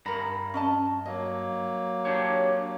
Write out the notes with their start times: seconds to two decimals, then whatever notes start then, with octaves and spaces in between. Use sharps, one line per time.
0.06 G2 A#4 A#5 B5
0.54 C#4 D#5 A5
1.06 F#3 A#3 D#5
2.05 D4 G4 C#5